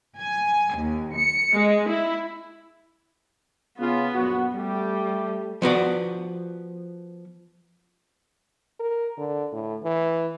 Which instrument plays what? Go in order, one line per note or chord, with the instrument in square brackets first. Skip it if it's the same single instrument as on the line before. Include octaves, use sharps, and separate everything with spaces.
[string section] G#5
D#2
C#7
G#3
E4
[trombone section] C#3 F4 [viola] B3
[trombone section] A#1 F#2 F#4
[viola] G3 [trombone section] A3 G4
[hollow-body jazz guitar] F3 B3 F#4 D5
[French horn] A#4
D3
A2
E3